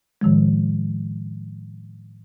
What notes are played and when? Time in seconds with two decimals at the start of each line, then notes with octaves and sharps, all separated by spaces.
0.21 A2 D#3 F3 G#3